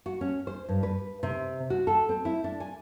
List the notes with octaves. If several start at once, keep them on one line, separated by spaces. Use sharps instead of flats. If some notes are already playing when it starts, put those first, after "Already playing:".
F#4
C#4
C5
G2
B4
C3
F#4
A4
C4
E4
D4
G#5